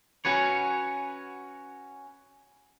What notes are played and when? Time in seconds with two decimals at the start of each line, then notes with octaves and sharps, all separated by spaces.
0.25 C#4 F#4 B4 C#5